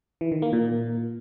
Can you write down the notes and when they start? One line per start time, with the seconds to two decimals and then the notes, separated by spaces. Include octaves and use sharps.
0.21 E3
0.32 D#3
0.42 A#3
0.53 A#2